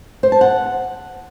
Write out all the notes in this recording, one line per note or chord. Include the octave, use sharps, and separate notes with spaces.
C5
A5
F#5